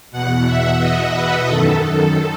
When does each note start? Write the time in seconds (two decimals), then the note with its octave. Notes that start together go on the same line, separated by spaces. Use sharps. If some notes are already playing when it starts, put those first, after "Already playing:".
0.11 E2 B2 F#5
0.46 E5
0.79 D#5
1.13 B4
1.47 F#2 D#3 A4
1.82 A4